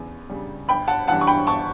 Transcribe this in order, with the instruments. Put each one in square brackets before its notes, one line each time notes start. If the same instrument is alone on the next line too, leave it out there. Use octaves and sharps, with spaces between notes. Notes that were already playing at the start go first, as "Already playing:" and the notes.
Already playing: [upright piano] E2 C#3
C#3 G3
G1 G5 B5
F#5 A5
F#2 E3 G3 F#5 A5
C#6
G5 B5
G1 A5 C#6